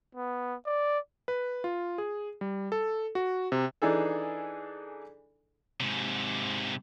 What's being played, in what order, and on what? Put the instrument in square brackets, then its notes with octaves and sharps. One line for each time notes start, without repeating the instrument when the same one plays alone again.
[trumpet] B3
D5
[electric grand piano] B4
F4
G#4
G3
A4
F#4
C3
[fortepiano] E3 D4 D#4 G#4 A4
[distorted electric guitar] G#2 C3